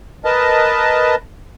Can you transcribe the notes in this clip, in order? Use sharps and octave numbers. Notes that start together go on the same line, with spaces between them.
A#4 B4 D#5 A5